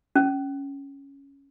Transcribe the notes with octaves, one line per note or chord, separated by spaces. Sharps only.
C#4